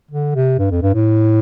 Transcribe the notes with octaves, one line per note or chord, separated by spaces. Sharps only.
D3
C3
G2
F2
G2
A2